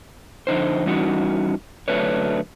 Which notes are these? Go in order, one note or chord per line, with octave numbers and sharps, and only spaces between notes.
F2 D3 D#4 C5
E3 G3 C#4 D#4 F#4
D3 F#3 A3 D4 B4 C#5